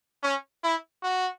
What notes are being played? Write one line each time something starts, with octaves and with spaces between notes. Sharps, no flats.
C#4
E4
F#4